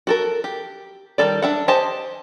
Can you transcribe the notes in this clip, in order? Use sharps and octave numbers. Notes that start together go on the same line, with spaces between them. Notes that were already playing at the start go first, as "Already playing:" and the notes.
F#4 A4 A#4
G4
D#3 G3 A3 A4 D5
D4 E5 F#5
G4 C5 D#5 G#5 A5